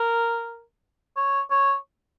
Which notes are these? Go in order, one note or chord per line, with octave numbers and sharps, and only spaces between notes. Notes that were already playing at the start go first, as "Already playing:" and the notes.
Already playing: A#4
C#5
C#5